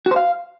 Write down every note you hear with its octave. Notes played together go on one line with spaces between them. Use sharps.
F#4
C5
F5